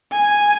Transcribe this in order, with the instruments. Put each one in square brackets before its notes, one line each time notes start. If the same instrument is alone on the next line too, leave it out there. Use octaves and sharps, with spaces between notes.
[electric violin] G#5